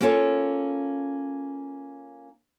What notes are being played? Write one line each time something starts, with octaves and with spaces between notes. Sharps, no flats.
A#3 C#4 F4 A4 C#5